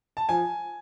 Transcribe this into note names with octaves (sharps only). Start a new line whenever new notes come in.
A5
F3 G#5